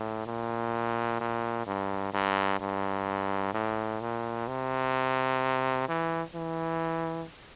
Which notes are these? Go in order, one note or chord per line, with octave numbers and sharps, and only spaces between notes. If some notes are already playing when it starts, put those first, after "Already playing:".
Already playing: A2
A#2
A#2
G2
G2
G2
A2
A#2
C3
E3
E3